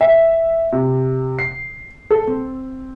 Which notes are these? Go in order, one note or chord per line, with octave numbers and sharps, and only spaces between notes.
E5
C3
C7
A4
C4